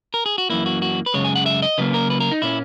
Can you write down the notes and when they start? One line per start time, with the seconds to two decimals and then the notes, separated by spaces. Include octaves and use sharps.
0.14 A#4
0.26 G#4
0.38 F#4
0.50 F#2 E3 A#3 E4
0.66 F#4
0.82 F#4
1.06 B4
1.14 F#2 C#3 G#3 C#5
1.24 G#5
1.35 F#5
1.46 E5
1.62 D#5
1.78 C#3 F#3 A#3 B4
1.94 A#4
2.10 B4
2.20 A#4
2.31 D#4
2.42 A#2 A#3 C#4 E4